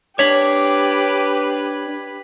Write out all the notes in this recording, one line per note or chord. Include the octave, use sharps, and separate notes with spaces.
D4 G4 B4 C#5 D6 G#6 B6 F#7